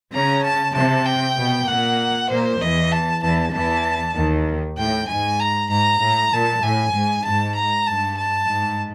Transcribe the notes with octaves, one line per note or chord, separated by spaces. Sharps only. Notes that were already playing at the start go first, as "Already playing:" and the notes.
C#3 C#4 A#5
A5
C3 C4 A5
G5
B2 B3
A#2 A#3 F#5
A#2 A#3 C5
E2 E3 D#5
A5
E2 E3 A5
E2 E3 A5
D#2 D#3
A2 G5
G#2 G#5
A#5
G#2 A#5
A2
A#2 A5
A2 G#5
G#2
G#2 A5
A#5
G2 A5
A5
G#2